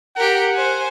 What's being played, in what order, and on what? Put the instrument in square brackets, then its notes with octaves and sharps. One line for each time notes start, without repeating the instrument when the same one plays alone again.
[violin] G4 A#4 [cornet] F#5
[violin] C5 G#5